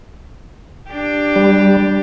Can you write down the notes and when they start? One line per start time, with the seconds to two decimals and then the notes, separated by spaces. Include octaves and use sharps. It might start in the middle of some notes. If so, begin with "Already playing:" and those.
0.91 D4 G4
1.36 G3